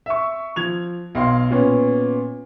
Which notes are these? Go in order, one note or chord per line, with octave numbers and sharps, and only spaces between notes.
E5 C#6
F3 G#6 F7
B1 F5 C6
A#2 B3 C#4